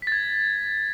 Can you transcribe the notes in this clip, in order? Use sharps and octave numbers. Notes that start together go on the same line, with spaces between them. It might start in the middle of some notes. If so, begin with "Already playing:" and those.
G#6 A6 B6